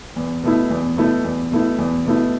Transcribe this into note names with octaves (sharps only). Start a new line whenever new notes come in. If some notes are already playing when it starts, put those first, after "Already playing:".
E2
B2 A3 E4
E2
B2 A3 E4
E2
B2 A3 E4
E2
B2 A3 E4